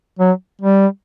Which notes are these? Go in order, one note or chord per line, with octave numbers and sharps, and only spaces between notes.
F#3
G3